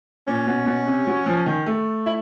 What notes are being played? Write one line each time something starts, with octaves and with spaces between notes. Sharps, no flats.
A#2 C#4
B2
B2
C3
F#3
F3
D#3
A3
E4